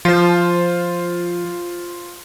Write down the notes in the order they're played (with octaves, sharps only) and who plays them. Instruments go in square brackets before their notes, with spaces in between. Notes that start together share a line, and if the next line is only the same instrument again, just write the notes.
[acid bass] F3 [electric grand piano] F4 C5